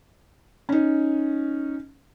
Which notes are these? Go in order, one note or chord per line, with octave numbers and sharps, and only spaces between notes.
C#4 D#4